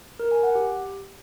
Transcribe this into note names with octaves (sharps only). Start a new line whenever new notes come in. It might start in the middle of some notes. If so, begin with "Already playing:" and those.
A#4
G#5
F#5
G4